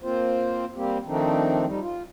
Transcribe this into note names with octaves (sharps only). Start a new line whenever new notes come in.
A#3 C4 F4 C5
G3 A#3 C4 G4
D#3 F3 A3 C4 D4 D#4
F2 G3 D#4
F4